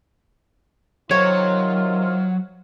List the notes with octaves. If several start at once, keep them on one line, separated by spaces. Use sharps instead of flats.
C3 D#3 F#3 F4 C#5